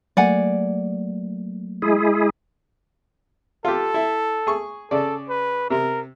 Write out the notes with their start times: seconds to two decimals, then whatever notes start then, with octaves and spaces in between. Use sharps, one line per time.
0.17 F#3 A3 A#3 D5 F#5 G#5
1.82 G#3 E4 G#4
3.65 F4 G4 A4
3.94 E4
4.47 G#4 C#6
4.91 C#3 A4 D5
5.29 B4
5.70 C3 A#4